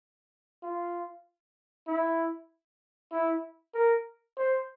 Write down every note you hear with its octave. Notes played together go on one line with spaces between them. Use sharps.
F4
E4
E4
A#4
C5